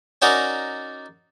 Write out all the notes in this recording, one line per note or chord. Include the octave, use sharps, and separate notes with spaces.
C#4 D#4 F#4 A#4 D5 D#5